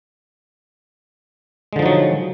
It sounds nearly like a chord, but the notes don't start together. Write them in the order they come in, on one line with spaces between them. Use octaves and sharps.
G#3 D3 F3 D#4 F#3